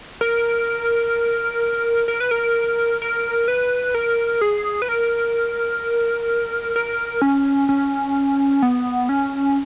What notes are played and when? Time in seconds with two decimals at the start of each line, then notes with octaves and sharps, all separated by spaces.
0.21 A#4
2.08 A#4
2.20 B4
2.31 A#4
3.02 A#4
3.48 B4
3.95 A#4
4.41 G#4
4.82 B4
4.89 A#4
6.76 A#4
7.22 C#4
7.69 C#4
8.62 B3
9.09 C#4